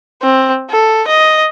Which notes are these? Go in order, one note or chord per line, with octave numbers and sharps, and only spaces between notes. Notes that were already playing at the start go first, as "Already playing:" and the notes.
C4
A4
D#5